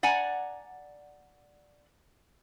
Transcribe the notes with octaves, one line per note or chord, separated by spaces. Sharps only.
D5 F#5 G#5 A#5